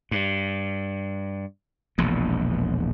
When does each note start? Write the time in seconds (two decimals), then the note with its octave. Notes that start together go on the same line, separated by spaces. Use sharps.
0.11 G2
1.98 E1 A#1 E2